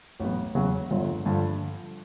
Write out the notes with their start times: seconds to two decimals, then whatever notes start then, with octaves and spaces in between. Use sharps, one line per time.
0.20 A1 A2 F#3 B3
0.55 E2 C#3 F#3
0.91 G1 G2 D3 F3
1.26 G2 D3 F3